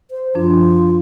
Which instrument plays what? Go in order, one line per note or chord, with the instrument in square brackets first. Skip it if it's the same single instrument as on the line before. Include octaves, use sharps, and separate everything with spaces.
[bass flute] C5
[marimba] F#2 F3 D4 [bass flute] F4